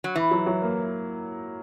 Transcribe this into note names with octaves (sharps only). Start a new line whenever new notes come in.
F#3
E3 E4
F#3
F#3
A#3